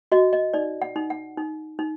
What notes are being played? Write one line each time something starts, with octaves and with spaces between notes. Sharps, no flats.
F#4 D#5
D#5
D#4 D5
F#5
D#4
F#5
D#4
D#4